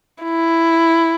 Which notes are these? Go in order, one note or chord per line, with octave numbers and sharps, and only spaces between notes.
E4